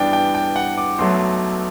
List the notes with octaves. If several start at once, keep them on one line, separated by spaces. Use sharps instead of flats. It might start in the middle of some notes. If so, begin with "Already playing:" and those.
Already playing: G2 E3 B3 D4 D5 G5
G5
G5
F#5
D6
B1 B2 F#3 A3 C6